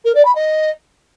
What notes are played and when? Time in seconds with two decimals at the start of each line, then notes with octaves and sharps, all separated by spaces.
0.04 A#4
0.15 D5
0.25 B5
0.35 D#5